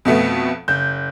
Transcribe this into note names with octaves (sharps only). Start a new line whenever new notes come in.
F2 B2 A3 B3
F#1 G6